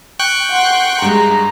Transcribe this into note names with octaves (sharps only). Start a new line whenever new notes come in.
G5 C#6 F#6
F#5 C6
G2 G3 G#3 A#5